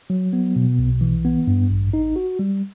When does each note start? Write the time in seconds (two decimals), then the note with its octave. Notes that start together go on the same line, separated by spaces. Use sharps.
0.10 F#3
0.33 B3
0.56 B2
0.79 B1
1.01 E3
1.25 B3
1.47 G2
1.71 A1
1.93 D#4
2.16 F#4
2.39 G3